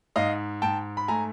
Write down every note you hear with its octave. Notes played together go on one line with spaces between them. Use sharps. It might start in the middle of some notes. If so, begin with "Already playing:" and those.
G#2 D#5 F5
G#2 G5 A5
B5
A3 G#5 A#5